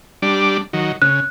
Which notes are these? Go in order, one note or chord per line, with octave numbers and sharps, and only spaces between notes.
G3 D4
D#3 F#3
C#3 F#6